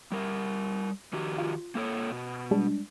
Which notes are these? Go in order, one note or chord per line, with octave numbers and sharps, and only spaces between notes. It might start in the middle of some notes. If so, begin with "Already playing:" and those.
G3 A#4
D#3 F#4 G4
F4
A#3 A4 C#5
B2
G3 G#3 D4